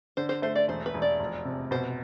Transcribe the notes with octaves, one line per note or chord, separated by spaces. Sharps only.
D3 C5
C5
A3 C5
D5
E1 C5
B4
E1
D5
F1
C3
B2 C5